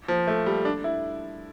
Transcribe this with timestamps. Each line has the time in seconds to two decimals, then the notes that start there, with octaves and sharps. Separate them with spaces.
0.08 F3
0.27 A3
0.46 G3
0.65 D4
0.84 E4